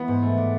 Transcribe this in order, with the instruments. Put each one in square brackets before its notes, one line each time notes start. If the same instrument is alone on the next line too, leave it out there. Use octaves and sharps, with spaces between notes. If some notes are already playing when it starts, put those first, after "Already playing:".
Already playing: [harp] E3 [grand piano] B3
[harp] G#2
A3
D4